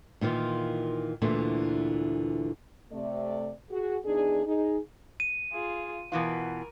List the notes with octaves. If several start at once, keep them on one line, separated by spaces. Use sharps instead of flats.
A#2 D#3 E3 F4
D2 A#2 D3 E3
C3 A3 D5
F#4 G#4
E2 D4 D#4 G#4
D#4 G#4
D#7
F4 G#4
B2 E3 F4 A#4